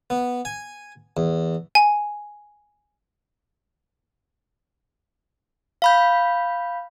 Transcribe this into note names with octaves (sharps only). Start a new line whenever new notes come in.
B3
G#5
E2
G#5
F5 B5 G6